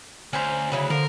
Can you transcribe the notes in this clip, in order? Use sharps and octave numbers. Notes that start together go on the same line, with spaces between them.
D2 C#4 C5 A#5
C#3 F#3 E4
D3 F3 A#4